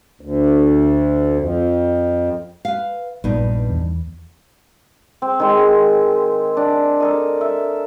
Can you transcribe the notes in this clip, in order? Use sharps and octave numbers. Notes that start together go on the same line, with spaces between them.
D2
F2
B4 F5
A#1 G2 A#2 B3 D#4
E2
C4
D#3 G#3 C6
D4
A4 A#4 D#5
E5